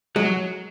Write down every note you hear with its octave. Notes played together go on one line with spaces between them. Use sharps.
F#3 G#3